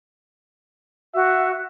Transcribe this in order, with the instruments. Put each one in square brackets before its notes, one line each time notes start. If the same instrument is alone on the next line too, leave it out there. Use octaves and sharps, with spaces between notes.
[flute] F#4 [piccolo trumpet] E5